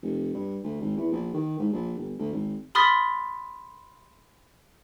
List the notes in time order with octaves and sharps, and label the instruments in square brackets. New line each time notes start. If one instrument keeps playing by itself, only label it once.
[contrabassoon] F1
G2
D2
G#1
E2
A#1
D#3
G#2
A#1
G1
D2
G#1
[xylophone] B5 C6 D#6 F6 A6 B6